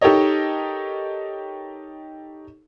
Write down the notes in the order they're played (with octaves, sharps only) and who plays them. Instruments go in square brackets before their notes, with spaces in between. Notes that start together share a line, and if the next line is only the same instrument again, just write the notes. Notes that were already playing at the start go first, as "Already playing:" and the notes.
[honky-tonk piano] D#4 G4 A4 A#4 C#5 D#5